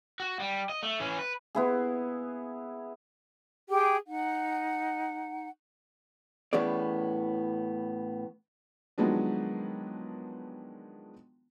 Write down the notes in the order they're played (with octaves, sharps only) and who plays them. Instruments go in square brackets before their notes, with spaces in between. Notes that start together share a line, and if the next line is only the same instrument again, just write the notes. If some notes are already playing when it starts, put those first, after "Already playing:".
[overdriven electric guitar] F#4
G3
D#5
A3
E3 C#4
B4
[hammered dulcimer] B3 E4 G#4
[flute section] G4 G#4 G5 D6
D#4 F#5
[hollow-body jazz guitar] A2 E3 B3 C#4 G#4 D5
[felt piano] D#3 F3 F#3 G#3 B3 D4